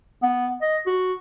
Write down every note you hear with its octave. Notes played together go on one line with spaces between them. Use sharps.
B3
D#5
F#4